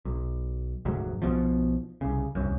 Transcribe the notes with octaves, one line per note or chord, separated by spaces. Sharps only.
B1
F1 D2 G#2 F#3
B1 B2 F3
C2 C#3
D1 C2 F#2